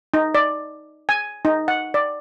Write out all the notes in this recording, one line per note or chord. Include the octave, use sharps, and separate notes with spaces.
D#4
D5
G#5
D#4
F#5
D5